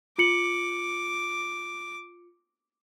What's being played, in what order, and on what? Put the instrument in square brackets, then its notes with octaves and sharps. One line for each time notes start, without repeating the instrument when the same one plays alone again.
[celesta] F4 C#7 F#7 [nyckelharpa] D6